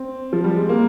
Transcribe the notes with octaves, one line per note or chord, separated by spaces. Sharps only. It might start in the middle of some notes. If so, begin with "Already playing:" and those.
Already playing: C4
F3
G3
G#3
A#3